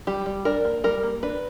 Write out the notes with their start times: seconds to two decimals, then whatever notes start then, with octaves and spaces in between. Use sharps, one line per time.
0.07 G3 G4
0.26 G3
0.45 D4 A#4
0.65 A#3
0.84 G3 A#4
1.03 A#3
1.23 D4 B4